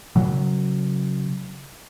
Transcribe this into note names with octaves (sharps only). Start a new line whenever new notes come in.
C#3 F#3